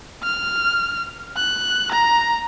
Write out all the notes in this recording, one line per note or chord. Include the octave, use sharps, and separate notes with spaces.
F6
F#6
A#5